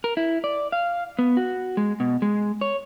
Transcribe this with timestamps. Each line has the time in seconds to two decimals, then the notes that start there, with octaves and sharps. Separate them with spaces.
0.04 A#4
0.17 E4
0.44 D5
0.72 F5
1.19 B3
1.37 F#4
1.77 G#3
2.00 B2
2.22 G#3
2.61 C#5